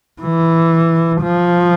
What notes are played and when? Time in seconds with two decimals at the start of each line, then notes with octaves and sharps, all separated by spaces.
0.22 E3
1.22 F3